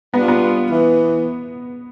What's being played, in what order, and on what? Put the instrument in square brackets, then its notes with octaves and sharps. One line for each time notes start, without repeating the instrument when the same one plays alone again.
[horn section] G3 D4 F4 [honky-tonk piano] B3
[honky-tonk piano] B3
[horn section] E3